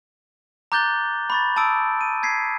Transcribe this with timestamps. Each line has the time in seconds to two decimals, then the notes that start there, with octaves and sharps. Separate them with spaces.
0.72 A#5 D6 F#6 G6 A6 G7
1.30 B5 C#6 A6
1.57 A5 B5 D#6 E6 D7
2.01 D#7
2.23 G#6 B6 C7